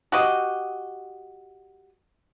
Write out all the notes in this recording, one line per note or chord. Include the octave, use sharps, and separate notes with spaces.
F#4 G4 D#5